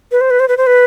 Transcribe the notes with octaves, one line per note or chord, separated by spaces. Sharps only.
B4
C5
B4
C5
B4
C5
B4